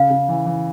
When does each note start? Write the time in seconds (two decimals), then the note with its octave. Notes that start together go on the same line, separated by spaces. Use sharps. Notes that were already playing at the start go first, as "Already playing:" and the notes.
Already playing: C#3 F5
0.10 C#3
0.29 E3
0.46 E3